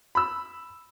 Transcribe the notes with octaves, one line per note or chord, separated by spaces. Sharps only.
B5 E6